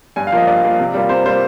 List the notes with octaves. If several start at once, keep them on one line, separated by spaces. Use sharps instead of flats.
G2 G#5
F5
F3 A#3 D#5
G2 D5
F3 A#3
C3
G3 A#3 F4
C3 C5
G3 A#3 F4 C5